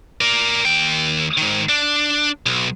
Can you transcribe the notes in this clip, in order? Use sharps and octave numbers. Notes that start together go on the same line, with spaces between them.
A#4 D5
D#2 G5
G#2 D#3
D4
B1